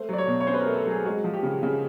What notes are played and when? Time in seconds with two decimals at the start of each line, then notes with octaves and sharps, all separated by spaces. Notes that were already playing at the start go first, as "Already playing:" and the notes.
Already playing: A3 C5
0.09 F#3 D5
0.18 C#5
0.27 B2
0.40 C#5
0.47 C#4 C5
0.54 B4
0.61 A#4
0.66 A3
0.76 A4
0.86 F#3 G#4
1.05 G#3 F#4
1.24 F3
1.34 G4
1.43 C#3
1.63 C#3 G#4